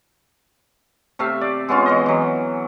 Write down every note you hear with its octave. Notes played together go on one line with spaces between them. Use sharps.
C3 A3 E5 F5
D5
G#3 B3 C#4 F4
E3 C#4 D#5
E3 F#3